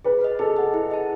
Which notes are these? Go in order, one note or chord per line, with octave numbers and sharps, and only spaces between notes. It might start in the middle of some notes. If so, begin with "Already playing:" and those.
G#4 B4
B4 D#5
G#4 A4
D#5 F#5
E4
G#4 D#5 A5